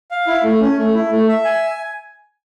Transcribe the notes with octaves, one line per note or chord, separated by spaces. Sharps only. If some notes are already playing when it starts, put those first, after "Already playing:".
F5
E4
A3
C#4
A3
E4
A3
E5
G#5